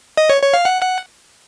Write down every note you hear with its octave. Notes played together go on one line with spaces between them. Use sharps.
D#5
C#5
C#5
F5
F#5
F#5